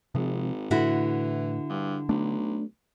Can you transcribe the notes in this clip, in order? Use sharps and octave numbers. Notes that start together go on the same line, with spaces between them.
G#1 C3 F3 G#3
A2 D3 E3 E4 F#4
G2
B1 A3 D4